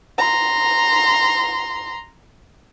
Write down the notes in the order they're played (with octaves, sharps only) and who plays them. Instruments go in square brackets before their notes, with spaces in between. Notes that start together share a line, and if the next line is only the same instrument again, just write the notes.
[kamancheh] A#5 C6